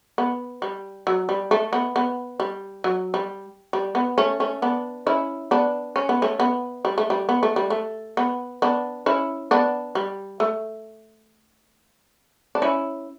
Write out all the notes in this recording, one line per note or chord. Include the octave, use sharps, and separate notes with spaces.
B3
G3
F#3
G3
A3
B3
B3
G3
F#3
G3
G3
B3
A3 C#4
A3 C#4
B3 D4
C#4 E4
B3 D4
C#4
B3
A3 C#4
B3
G3
A3
G3
B3
A3
G3
A3
B3
B3 D4
C#4 E4
B3 D4
G3
A3
D4
C#4 E4